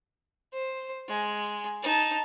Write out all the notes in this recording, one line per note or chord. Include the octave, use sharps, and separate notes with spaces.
C5
G#3
D#4 A5